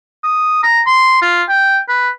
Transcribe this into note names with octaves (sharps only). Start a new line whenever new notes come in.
D#6
A#5
C6
F4
G5
B4